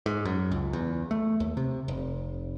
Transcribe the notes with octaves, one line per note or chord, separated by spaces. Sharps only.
G#2
F#2
C#2
E2
A3
D#2
C3
F1